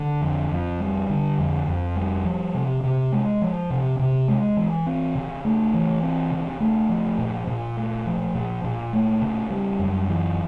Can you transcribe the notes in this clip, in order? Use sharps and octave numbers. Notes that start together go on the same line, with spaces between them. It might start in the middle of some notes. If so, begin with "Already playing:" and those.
Already playing: D3
F2
F2
G3
D3
F2
F2
G3
F3
C3
C3
G#3
F3
C3
C3
G#3
E3
C4
C#3
A3
E3
C4
C#3
A3
F3
A#2
A#2
A3
F3
A#2
A#2
A3
C#3
G3
F#2
E3